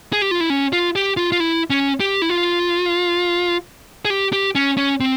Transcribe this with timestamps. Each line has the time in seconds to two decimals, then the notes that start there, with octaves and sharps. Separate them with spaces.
0.13 G#4
0.22 G4
0.31 F4
0.40 E4
0.50 C#4
0.73 F4
0.96 G4
1.17 F4
1.32 F4
1.40 E4
1.70 C#4
2.00 G4
2.22 E4
2.30 F4
4.05 G#4
4.10 G4
4.33 G4
4.55 C#4
4.77 C#4
5.00 C4